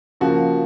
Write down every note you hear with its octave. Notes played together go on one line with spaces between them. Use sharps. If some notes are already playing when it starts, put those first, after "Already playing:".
C#3 F3 A#3 F#4